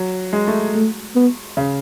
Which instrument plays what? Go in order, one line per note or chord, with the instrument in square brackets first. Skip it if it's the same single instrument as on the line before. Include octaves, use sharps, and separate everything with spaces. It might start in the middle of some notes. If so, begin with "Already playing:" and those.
Already playing: [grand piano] F#3
G#3
A3
[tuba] A3
B3
[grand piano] C#3